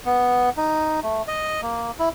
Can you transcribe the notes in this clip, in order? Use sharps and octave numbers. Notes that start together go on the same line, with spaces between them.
B3
D#4
A3
D#5
A#3
E4